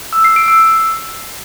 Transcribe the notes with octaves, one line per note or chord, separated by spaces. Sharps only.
E6
C7
D7
E6